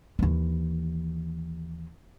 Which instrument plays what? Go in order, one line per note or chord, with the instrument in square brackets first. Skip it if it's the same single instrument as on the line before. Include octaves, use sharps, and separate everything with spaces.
[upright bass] D#2 E3